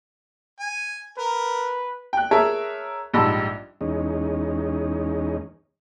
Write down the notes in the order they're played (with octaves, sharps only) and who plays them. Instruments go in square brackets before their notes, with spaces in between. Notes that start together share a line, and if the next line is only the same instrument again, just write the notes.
[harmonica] G#5
[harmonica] A#4 [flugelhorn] B4
[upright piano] G5 F#6
G#4 A#4 C#5 E5 A5
A#1 G#2 G3 A5 B5 E6
[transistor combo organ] E2 G#3 C#4 D#4